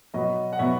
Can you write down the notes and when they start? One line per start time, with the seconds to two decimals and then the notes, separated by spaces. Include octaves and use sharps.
0.14 B2 F#3 B3 D#5
0.53 F#5
0.59 B2 F#3 B3 E5